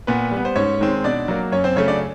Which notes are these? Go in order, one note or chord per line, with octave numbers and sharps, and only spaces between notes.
A#2 B3 B4
G3
B3
C5
G#2 C#4 C#5
D#3 G#3 C4
B2 D4 D5
F#3 A#3
F#2 C#4 C#5
C4 C5
C#3 F#3 A3 C#4 C#5
D4 D5